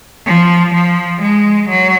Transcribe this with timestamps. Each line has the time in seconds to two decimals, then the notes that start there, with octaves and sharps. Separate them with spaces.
0.26 F3
0.74 F3
1.21 G#3
1.69 F#3